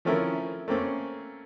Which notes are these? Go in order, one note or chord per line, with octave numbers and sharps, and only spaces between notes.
F3 A3 C4 C#4 E4 A#4
A3 A#3 C4 C#4